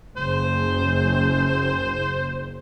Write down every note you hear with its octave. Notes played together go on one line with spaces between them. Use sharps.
F#1 C5